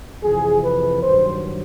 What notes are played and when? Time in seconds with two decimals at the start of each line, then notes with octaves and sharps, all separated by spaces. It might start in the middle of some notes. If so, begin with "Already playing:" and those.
0.23 F2 C3 E3 G#4
0.64 B4
1.03 G2 D#3 F#3 C5